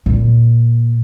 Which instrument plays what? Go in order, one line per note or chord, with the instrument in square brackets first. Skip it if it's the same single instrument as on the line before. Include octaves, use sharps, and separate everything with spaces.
[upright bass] A#2